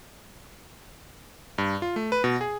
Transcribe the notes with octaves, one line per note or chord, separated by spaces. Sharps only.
G2
F4
A3
B4
B2
G#4